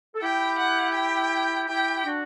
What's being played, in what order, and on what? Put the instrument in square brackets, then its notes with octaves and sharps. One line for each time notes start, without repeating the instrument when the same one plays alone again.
[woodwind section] A4
[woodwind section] E4 G4 [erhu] G5
[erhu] F#5
G5
[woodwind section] E4 G4 [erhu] G5
[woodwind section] G4
D4 F#4